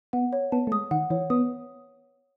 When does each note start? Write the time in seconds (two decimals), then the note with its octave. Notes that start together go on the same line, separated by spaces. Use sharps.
0.13 B3 F#5
0.33 C#5
0.52 B3 A5
0.67 A3
0.72 G#3 D#6
0.91 D#3 F#5
1.10 E3 C#5
1.30 B3 D#6